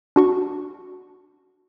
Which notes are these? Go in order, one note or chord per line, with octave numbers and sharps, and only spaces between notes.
D4 F#4 C#6